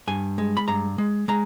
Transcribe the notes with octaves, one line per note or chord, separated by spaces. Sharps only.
G2 G#5
G#3
B5
G2 A#5
G#3
G#3 A#5